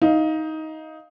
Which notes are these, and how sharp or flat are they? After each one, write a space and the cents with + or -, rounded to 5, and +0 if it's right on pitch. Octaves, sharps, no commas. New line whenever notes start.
D#4 +15 F5 +0